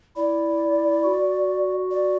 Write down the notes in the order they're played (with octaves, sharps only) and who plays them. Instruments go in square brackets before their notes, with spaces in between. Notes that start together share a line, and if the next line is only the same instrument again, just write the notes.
[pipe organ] E4 [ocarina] D5
[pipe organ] F#4
[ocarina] D5